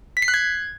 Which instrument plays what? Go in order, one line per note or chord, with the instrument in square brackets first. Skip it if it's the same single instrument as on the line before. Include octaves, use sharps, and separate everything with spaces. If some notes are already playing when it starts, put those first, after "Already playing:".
[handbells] B6
C7
F#6
G#6